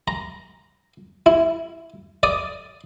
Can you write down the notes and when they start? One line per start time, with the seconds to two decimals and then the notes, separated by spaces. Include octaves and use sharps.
0.08 A#5
1.26 E4
2.23 D5 D#6